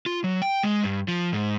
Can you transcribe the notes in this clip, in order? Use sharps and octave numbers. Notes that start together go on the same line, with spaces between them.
F4
F#3
G5
G#3
G2
F3
G#2